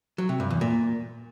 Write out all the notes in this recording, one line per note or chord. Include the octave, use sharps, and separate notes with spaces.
F#3
C3
G2
E2
A#2